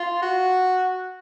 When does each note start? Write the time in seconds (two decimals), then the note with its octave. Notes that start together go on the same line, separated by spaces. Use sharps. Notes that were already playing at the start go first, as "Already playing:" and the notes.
Already playing: F4
0.23 F#4